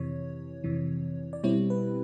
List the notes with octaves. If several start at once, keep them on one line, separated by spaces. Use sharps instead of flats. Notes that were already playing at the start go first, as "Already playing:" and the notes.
Already playing: F2 C3 E3 C#5
F2 C3 E3
D5
B2 G3 C4 E4 C#5
B4